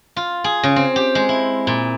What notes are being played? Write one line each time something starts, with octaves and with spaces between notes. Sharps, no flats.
F4
G#4
C#3
C4
G4
G#3
E4
A#2